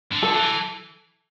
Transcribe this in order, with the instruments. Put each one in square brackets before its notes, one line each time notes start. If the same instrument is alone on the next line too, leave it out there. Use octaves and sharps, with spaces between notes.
[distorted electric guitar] D3
[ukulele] A4
[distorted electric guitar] E3